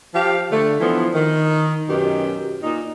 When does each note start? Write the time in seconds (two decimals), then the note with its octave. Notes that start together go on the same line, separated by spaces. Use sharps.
0.14 F3 G4 F5
0.51 D3 A3
0.80 D3 E3 F3 B3
1.14 D#3
1.89 F#2 B2 D#3 G4
2.62 A#2 D#4